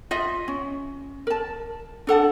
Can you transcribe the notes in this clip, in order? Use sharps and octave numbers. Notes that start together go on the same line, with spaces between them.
F4 D#5 E5
C#4
A#4 A5
D4 A4 F#5 A5